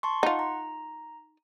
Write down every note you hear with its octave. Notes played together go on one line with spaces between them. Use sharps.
A5 C6 C#6
D#4 F4 F#5
A#5